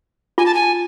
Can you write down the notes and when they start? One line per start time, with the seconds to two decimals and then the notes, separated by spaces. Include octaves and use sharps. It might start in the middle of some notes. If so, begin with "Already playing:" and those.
0.38 F4 G#5
0.46 A5
0.55 G#5